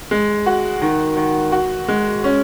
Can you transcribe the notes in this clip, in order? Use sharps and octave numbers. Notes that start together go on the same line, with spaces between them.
G#3
F#4
D#3
D#3
F#4
G#3
C#4